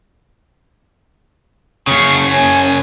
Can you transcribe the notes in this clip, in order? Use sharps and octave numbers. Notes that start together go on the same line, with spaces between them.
F#2 C#3 C#6 C7
C#4 G#5